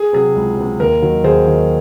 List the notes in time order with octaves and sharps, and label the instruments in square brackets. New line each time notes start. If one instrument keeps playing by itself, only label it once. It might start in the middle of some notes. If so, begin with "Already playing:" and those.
Already playing: [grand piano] G#4
C3 F#3 G#4
C#2
C3 F#3
D#2 A#4
D#3 F#3
D#2 G#4 C5
D#3 F#3